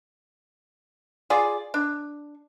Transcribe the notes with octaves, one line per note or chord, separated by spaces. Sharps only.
F4 G#4 D5
D4